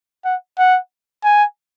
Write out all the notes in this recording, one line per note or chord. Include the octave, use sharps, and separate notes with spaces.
F#5
F#5
G#5